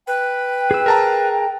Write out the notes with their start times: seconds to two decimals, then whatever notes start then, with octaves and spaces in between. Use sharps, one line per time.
0.07 B4 G5
0.71 G#4 E6
0.86 A#4 A5 A#5